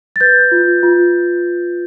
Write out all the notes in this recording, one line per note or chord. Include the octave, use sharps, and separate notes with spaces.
A6
B4 G6
F4
F4